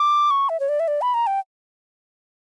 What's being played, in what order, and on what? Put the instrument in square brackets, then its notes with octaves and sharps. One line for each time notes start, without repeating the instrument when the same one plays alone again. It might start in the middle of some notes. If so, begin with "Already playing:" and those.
Already playing: [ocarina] D6
C#6
E5
C#5
D5
E5
D5
B5
A#5
G5